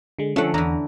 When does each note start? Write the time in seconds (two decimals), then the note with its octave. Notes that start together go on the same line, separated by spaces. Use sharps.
0.19 D3 G#3
0.36 D3 F3 A3 C#4 A4 F#5
0.54 E2 D3 E3 A#5